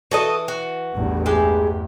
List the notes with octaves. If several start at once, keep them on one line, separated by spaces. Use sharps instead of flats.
E3 F#4 A4 D#5
F#4
A1 E2 G2
G#3 E4 G4